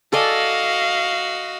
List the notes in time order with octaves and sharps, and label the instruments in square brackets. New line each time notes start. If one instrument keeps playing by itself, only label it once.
[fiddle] F#4 D#5 [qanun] A4 D5 G#5 [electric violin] F5